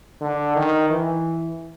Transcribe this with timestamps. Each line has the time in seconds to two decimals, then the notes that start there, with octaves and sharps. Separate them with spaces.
0.21 D3
0.56 D#3
0.90 E3